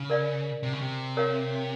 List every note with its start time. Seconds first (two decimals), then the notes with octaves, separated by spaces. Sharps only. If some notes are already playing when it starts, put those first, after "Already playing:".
Already playing: C#3
0.10 A#4 D5 F5
0.63 C3
0.72 C#3
0.81 C3
1.17 A#4 C#5 F5